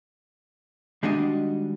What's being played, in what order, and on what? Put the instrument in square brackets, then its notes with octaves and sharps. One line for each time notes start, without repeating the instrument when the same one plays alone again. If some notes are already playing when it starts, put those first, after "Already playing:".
[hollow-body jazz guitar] D#3 G3 G#3 D4 F#4 D#5